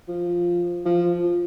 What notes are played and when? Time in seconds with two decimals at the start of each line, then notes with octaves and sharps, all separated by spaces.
0.08 F3
0.85 F3
1.24 F3